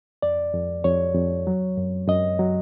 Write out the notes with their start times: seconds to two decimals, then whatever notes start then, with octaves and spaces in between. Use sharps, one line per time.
0.22 F2 D5
0.54 F2
0.84 F2 C#5
1.15 F2
1.47 F#3
1.77 F#2
2.08 F#2 D#5
2.39 F#3